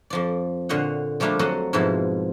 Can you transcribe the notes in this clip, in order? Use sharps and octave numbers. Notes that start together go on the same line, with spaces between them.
F2 F3 D5
A#2 D3 C5 C#5 D#5 F#5
F3 G3 A3 A#3 D4 F4
F2 F#3 A4 C5 D#5 F#5
F2 G#2 B2 F3 E4